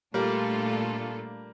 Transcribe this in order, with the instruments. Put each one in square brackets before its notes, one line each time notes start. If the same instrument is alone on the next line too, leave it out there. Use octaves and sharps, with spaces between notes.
[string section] A#2 A3 D4 F4 A4 [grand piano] G3 A#3